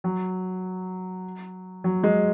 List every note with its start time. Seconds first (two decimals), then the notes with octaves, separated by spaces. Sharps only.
0.04 F#3
1.84 F#3
2.03 G#3